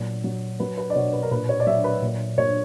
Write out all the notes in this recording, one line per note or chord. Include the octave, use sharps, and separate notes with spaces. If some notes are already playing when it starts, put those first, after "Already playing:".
Already playing: A#2 F#3
F#3
F#3 B4
B4
D5
B2 C#5
B4
A#4
A#2 B4
C#5
D5
F#3 E5
B4
A#2
A#2 C#5